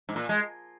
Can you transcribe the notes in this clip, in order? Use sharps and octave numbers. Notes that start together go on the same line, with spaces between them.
G#2
A#2
G#3